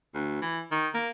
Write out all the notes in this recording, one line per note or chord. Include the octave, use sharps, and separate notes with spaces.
D2
E3
D#3
A#3